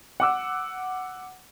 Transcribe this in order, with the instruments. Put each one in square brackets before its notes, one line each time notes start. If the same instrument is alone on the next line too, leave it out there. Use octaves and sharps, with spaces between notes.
[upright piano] F#5 D6 E6